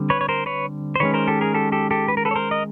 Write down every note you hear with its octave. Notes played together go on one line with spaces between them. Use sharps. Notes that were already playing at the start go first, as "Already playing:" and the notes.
Already playing: D3 G3 C4
B4 C#5
C#5
A#4 C5
B4 C#5
C5
D#3 G#3 C#4 B4 C#5
A#4 C5
G4 A4
G#4 A#4
G4 A4
G4 A4
G4 A4
B4
A#4
A4 B4
C#5
A#4 C5
D#5